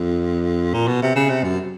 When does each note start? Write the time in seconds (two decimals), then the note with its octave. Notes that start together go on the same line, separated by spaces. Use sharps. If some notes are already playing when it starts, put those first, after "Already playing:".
Already playing: F2
0.74 A#2
0.88 B2
1.02 C3
1.16 C#3
1.30 C3
1.44 F#2